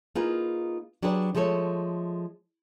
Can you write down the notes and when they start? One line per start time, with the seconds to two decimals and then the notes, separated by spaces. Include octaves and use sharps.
0.15 A#3 D#4 F4 G#4 B4
1.02 F#3 D4 G4 G#4 B4 D5
1.35 F3 G#3 A3 A4 C#5